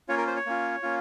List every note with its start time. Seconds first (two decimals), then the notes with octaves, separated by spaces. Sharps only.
0.09 A#3 C#4 F4 C#5
0.18 A#4
0.27 C5
0.37 C#5
0.46 A#3 C#4 F4
0.83 A#3 C#4 F4